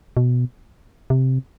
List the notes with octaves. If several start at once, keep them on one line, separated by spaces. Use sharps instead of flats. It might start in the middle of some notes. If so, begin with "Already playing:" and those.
B2
C3